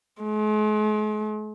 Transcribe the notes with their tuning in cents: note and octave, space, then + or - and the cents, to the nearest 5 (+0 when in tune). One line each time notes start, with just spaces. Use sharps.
G#3 +45